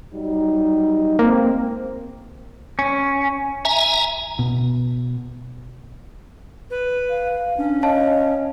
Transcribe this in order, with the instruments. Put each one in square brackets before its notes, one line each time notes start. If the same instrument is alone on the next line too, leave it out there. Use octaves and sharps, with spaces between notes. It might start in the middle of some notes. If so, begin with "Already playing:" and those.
[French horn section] F#3 G3 D#4
[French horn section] G#3 C4 [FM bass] A#3
[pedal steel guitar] C#4
[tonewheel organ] E5 G#5 A#5
[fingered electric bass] B2
[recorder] B4
[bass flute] F5
[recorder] C#4 [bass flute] D4
[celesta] C#5 F5 A5 [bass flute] D#5